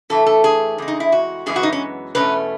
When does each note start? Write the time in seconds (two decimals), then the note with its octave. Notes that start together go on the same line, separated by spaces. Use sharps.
0.10 A2 E3 A3 A4
0.26 A4
0.44 G#4
0.78 E2 C#3 G#3
0.88 D#4
1.00 E4
1.12 F#4
1.46 F#2 E3 G#3 B3 G#4
1.56 F#4
1.63 D#4
1.73 C#4
2.15 E2 B2 A3 C#4 B4